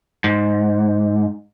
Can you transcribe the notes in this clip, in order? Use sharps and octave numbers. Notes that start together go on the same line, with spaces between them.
G#2